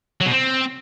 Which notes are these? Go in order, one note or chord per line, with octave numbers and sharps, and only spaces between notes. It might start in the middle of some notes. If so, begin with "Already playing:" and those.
F#3
B2
C4